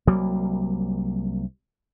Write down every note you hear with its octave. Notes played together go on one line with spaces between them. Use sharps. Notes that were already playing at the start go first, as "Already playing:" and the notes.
C2 F#3 G3 A#3